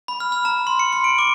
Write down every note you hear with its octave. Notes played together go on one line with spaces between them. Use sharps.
B5
F6
F6
A#5
C6
C#7
C6
D7
D6